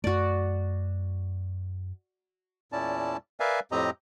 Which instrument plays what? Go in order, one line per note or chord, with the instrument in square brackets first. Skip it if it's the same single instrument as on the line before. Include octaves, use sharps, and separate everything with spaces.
[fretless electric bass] F#2 A3 [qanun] F#4 D5
[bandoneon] E2 A#2 C#4 E4 D5 A5
A#4 B4 D5 E5 F5 G#5
F2 A2 C4 G4 D#5 A#5